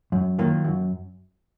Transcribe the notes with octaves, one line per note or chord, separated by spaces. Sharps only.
F#2
D#3 F#3 A#3 F4
F#2